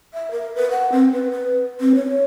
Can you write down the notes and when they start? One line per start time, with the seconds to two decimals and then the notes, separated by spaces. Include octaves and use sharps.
0.14 E5
0.31 A#4
0.56 B4
0.71 F#5
0.92 C4
1.13 B4
1.31 B4
1.80 C4
1.95 C#5